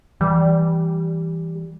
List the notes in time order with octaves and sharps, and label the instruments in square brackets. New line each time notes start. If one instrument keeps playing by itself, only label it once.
[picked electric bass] E3 [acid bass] G3